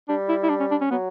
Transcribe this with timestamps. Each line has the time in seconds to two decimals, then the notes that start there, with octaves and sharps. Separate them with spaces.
0.09 G3 D4
0.29 E4
0.43 E4
0.50 D4
0.60 C#4
0.71 D4
0.81 C#4
0.91 F#3 B3